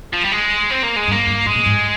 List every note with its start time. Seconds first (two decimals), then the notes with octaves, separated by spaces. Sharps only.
0.13 F3
0.23 G3
0.32 G#3
0.71 C4
0.83 A#3
0.97 G#3
1.08 G2
1.11 A#3
1.27 G2
1.46 G2 G#3
1.55 A#2
1.66 G#2